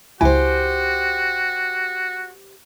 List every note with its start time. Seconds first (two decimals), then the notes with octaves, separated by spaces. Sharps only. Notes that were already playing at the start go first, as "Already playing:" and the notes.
0.21 C#2 E4 F#4 G4 C5 G#5